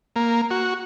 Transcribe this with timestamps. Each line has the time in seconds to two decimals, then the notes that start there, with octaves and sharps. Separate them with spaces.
0.16 A#3
0.50 F#4